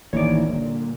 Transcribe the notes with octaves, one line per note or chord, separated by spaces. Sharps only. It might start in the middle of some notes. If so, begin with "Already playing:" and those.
A1 D2 D#3 E3 A#3 C#5 D5
A#2 D3 G3